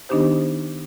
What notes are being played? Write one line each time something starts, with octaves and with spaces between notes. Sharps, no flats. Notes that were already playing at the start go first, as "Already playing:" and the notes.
D#3 B3 D4 D#4 G4 C5